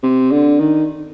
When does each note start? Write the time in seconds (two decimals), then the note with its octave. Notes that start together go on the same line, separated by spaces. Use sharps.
0.03 C3
0.32 D3
0.60 D#3